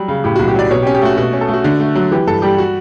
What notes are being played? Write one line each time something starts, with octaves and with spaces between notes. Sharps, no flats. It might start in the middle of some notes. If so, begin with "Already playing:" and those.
Already playing: F#3 G3
C#3
A2 G4
B1 F#4
G4
F#3 D5
B2 C#5
G4
C#4
G4
A3 F#4
B2 F#4
C#4
A4
A3
F#4
D3
A3
F#3
E3 G4
G2 A4
G3 G4
F#4